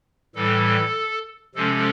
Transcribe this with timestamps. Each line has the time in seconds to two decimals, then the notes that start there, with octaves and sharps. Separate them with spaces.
0.35 A2 E3 G3 A4
1.55 C3 F3 G#3 C#4 A4